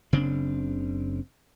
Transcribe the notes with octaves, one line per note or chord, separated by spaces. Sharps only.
F#1 C#3 C4 D4